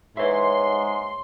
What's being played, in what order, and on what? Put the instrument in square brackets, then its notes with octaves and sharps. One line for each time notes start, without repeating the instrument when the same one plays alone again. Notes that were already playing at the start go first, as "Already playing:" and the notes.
[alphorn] G#2 [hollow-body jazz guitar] B4 E5 [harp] C#5 [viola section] C6